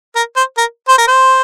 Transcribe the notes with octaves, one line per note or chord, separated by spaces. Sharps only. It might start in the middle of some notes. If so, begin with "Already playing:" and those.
A#4
C5
A#4
C5
A#4
C5